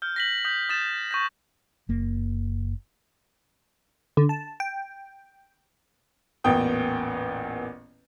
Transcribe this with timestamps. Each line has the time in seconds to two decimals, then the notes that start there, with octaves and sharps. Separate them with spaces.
0.02 F6 G6
0.16 A#6 B6 F#7
0.45 D#6 G6 B6
0.69 D#6 G6 A6 B6 E7
1.11 C#6 G6 A#6
1.89 F#1 A#3
4.17 D3
4.29 A5
4.60 G5
6.44 A1 E2 A#2 B3 G5 D#6